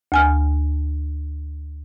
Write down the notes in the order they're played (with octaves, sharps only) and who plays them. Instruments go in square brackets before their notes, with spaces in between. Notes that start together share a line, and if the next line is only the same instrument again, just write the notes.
[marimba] D2 G#5 F6